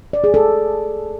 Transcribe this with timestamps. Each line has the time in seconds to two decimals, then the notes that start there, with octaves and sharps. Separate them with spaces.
0.13 D5
0.24 G#4
0.34 A4